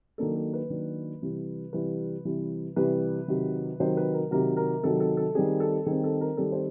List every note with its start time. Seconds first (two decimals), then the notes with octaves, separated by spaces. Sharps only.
0.18 D#3 F#3 A#3 D4 A4
0.36 A4
0.53 B4
0.70 D#3 F#3 A#3 D4
1.22 C3 E3 G3
1.73 C3 E3 G3 B4
2.25 C3 E3 G3
2.76 C3 E3 G3 B4
3.28 C3 D#3 F#3
3.80 C3 D#3 F#3 C5
3.97 B4
4.14 A#4
4.31 C3 D#3 F#3 A#4
4.57 A#4
4.83 C3 D#3 F#3 A4
5.00 A4
5.17 A4
5.35 D#3 G3 C4 G#4
5.60 A4
5.86 D#3 G3 C4 G#4
6.04 A4
6.21 A#4
6.37 D#3 G3 C4 A4
6.52 C5